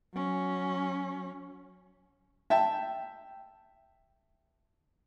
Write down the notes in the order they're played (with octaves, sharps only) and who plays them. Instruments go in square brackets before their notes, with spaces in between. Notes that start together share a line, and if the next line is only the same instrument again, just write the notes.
[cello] F#3 C#4
[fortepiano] E5 G5 A5